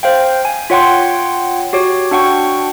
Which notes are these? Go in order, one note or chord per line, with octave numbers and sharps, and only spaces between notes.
C5 F5 G5
G#5
F4 C#5 F#5 G5 C6
F#4 G4 C#5
D4 F#4 F#5 G5 C#6